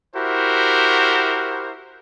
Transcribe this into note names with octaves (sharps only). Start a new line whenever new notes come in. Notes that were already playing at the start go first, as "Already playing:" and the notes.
E4 F#4 G4 A#4 C5